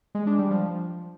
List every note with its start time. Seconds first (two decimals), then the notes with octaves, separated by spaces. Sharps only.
0.15 G#3
0.27 D4
0.39 G3
0.51 F3